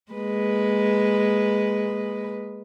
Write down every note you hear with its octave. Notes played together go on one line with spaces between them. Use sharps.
G#3 A#3 B4